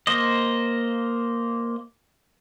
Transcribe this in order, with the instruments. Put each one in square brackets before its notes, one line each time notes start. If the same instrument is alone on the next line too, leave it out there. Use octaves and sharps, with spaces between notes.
[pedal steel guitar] A#3 C5 D#5